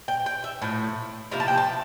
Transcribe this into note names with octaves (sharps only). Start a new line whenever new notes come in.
G5
G5
E5
A2 F3
C3 F3 A#3 E4 A#5
A5
G5
A5